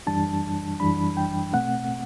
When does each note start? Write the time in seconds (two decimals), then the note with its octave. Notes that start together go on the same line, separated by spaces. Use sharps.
0.07 F#2 E3 G3 D4 A5
0.80 F#2 E3 G3 D4 B5
1.17 G5
1.53 B2 A3 C4 F#5